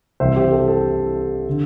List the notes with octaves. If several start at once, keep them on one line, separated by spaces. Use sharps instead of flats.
C2 C3 E3 C5 E5
G4
A4
A4
D3